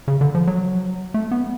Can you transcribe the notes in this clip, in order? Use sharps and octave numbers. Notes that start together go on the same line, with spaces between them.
C#3
D3
F3
F#3
A3
B3